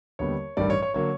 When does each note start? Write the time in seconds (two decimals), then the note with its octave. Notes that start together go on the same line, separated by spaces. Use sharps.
0.19 D#2 D3 G3 B3 C#5
0.57 A1 G2 D#3 G3 D5
0.70 C#5
0.82 C#5
0.94 D3 F#3 A#3 C#5